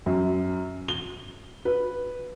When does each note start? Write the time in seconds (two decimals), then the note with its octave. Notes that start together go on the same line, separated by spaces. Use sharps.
0.06 F#2
0.88 G7
1.65 B4